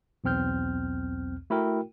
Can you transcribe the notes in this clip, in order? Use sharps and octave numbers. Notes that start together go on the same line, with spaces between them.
B1 E2 C4 F6 G6
A3 E4 F#4 A#4 G5